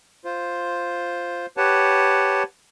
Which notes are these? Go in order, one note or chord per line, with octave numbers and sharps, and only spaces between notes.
F4 C5
G4 B4 C#5 F#5 A5